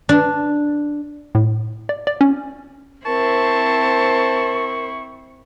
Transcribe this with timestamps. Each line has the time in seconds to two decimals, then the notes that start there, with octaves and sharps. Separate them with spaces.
0.09 D4
1.35 A2
1.89 D5
2.07 D5
2.21 C#4
3.06 C4 E4 A#4 C5 A5 C#6